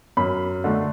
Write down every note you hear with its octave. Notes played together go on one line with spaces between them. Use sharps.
F#2 B5
D3 A3